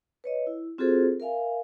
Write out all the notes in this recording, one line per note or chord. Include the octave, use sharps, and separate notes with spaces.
B4 C#5 D#5
E4
C4 F4 F#4 G#4 A4 C5
A#4 E5 F5 G#5